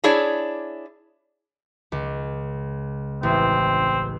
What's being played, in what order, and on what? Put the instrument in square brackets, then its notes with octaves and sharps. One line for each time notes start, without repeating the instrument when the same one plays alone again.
[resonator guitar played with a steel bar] D4 E4 G#4 C#5 D5
[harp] C#2
[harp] A1 [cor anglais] C4